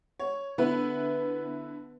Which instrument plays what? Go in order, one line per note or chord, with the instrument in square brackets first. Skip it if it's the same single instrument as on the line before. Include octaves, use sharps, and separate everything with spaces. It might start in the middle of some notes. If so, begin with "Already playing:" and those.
[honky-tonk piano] C#5
[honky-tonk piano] D3 E4 B4 [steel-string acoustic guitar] B3